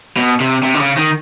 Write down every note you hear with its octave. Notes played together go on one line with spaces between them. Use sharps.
B2
C3
C3
D3
C#3
D#3